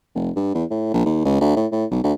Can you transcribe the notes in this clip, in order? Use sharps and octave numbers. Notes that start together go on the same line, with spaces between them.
F1
G2
E2
A2
A#1
D#2
C#2
D2
A2
A2
B1
D2